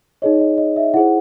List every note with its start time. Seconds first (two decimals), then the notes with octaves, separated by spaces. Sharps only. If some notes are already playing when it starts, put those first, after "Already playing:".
0.22 D#4 G#4 C#5 D#5
0.40 D#5
0.58 D#5
0.76 E5
0.94 E4 G#4 C5 F#5